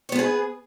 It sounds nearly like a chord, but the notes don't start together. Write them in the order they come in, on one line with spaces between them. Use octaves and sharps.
C#5 B3 B4 G#4